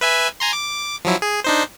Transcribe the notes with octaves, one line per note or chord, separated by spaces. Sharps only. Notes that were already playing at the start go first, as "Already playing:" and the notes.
B4 E5 G#5
G#5 A#5 C6
D6
F3 F#3 E4
G#4
D4 D#4 C5